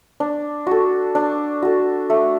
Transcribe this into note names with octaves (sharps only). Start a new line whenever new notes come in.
D4
F#4 A4
D4
F#4 A4
A3